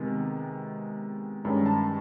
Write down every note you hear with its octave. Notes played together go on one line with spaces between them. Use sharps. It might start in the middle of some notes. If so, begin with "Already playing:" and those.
Already playing: C3 D#3 G#3 B3
G2 D#3 G#3 C#4 A#5
A5